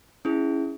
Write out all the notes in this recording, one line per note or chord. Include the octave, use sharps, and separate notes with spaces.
C#4 E4 G#4